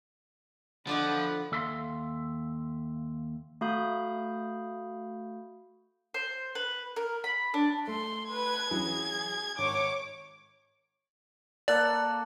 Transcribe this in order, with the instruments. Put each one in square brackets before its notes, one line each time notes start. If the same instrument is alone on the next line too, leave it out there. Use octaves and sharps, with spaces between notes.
[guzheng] D3 D5 D#5 [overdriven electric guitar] F3 [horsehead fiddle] F#5 B5
[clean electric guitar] D#2 A4 E5 F5 B5 C6
[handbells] A3 F#4 F5 B5 D#6 G6
[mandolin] C5
B4
A#4
B5
D4
[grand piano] A3 [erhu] C6
[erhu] B4 [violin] G#6
[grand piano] E3 F#3 C#4 [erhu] G#4
[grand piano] G#1 [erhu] C#5 [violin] D6
[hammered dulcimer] A#3 A4 F#5 [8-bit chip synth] D5